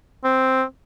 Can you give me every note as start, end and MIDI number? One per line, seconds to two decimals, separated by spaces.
0.24 0.63 60